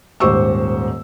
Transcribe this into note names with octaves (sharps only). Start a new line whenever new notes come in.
D#1 G#2 G4 C5 C#6 E6